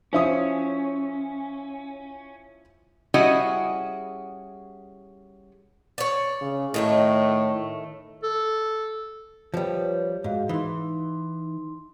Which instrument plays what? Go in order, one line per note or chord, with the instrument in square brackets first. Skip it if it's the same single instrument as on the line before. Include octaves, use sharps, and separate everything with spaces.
[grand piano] F3 E4 D#6 [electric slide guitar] C#4
[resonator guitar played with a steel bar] G3 C#4 E4 F#4 G#4 D#5
[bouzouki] C#5 D5
[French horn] C#3
[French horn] A2 [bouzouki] D#3 A3 C#5
[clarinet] A4
[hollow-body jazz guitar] F3 G3 [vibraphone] B4 C#5
[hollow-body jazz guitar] G#2 [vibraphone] F#4 G#4 F5
[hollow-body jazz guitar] E3 [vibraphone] D#4 C6